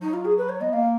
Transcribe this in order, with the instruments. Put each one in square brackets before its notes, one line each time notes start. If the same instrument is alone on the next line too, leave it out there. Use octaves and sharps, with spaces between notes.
[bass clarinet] F#3 [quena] D#4
[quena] F4
G#4
B4
C#5
[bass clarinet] B3 [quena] D#5
[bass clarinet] A#3 [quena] F5